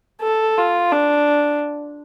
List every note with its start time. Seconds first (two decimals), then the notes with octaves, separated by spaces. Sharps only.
0.22 A4
0.58 F4
0.93 D4